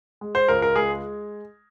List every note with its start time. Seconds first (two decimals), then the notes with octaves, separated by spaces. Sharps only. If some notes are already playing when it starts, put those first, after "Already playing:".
0.21 G#3
0.35 C5
0.48 C#2 A#4
0.62 A#4
0.76 G#3 G#4